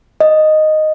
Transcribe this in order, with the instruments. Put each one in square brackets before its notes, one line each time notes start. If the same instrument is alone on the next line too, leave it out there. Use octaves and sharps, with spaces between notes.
[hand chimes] D#5